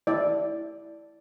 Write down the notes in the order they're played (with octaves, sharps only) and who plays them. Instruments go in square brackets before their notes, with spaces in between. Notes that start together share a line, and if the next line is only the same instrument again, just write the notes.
[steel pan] E4 D5